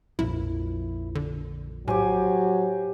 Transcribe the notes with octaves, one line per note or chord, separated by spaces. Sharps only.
A#1 F2 E4
D3
A2 F#3 G4 C5 G#5